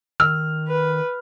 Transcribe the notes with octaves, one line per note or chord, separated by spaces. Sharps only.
D#3 E6 F6
B4